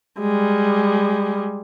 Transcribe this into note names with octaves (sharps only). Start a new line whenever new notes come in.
G3 G#3